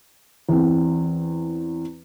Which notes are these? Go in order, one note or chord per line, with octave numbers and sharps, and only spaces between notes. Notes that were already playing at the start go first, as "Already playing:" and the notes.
E2 C4